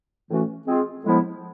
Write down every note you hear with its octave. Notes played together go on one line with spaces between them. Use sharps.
A2 E3 A3 C#4 F#4
G#3 C4 F4 G#4
A2 F3 G#3 B3 E4